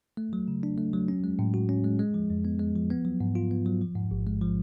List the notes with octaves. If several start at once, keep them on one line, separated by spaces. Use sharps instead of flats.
A3
F#3
C#3
D4
A3
F#3
C#4
G#3
A2
F#4
C#4
G#3
G#3
F3
F2
B3
G#3
F3
B3
F#3
G#2
F4
B3
F#3
F3
G#2
A1
G#3
F3